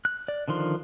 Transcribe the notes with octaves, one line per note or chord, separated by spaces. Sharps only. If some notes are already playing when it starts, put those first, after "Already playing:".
F#6
D5
D3 D#3 F3 C6